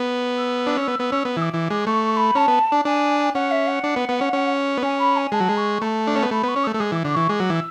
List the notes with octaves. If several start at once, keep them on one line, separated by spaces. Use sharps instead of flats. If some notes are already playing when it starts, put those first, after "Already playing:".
Already playing: B3
E6
D4
C#4
B3
B3
C#4
B3
E3 E6
D6
E3
G#3
A3 C#6
C#6
B5
C#4 A5
B3
D4
D4 G#5
C#4 F#5
E5
F#5
D4
B3
B3
C#4
C#4
B3
C#4 G#5
B5
G#5
G#3 A5
F#3
G#3
C#6
A3 A5
D4
C#4
B3
A3 B5
B3 C#6
C#4
A3 E6
A3
G#3 D6
E3
D3 D6
E3 C#6
G#3 D6
F#3
E3 E6